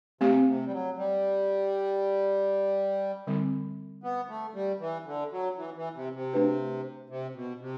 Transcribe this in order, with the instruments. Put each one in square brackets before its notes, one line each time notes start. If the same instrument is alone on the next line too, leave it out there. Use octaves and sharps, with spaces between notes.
[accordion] C3 [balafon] A3 C4 G4
[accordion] C3
G3
F#3
G3
[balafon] D3 G3 C4
[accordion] B3
A3
G3
E3
D3
F#3
E3
E3
C3
C3
[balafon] A3 D4 F#4 B4
[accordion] C3
B2
C3